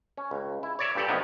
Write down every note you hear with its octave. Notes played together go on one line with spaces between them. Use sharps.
C#4
C#2
E4
C#5 D5 E5
G2 A#2 G4 A4 D5
C3 D#3 F3 F#3 A3 B3